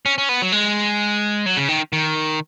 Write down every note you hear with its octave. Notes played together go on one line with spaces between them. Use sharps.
C#4
C#4
B3
F#3
G#3
F#3
C#3
D#3
D#3